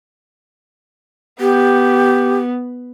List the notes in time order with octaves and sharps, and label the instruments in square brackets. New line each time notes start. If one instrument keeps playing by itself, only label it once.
[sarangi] B3 [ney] G4